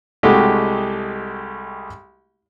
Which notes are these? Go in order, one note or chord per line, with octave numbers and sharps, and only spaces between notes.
C2 G#3 A3 F#4 G4 D#5